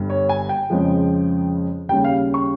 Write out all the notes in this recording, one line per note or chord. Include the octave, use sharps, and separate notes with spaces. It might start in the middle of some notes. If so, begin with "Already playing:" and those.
Already playing: G1 G2 G3
C#5
G#5
G5
F2 C#3 F3 G#3
D#2 C#3 G3 G5
F5
C#6